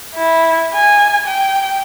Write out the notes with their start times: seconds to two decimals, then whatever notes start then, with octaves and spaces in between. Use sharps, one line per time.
0.15 E4
0.74 G#5
1.26 G5